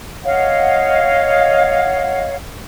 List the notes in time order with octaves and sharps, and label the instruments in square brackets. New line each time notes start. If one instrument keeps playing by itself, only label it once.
[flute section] C#5 D#5 F5 F#5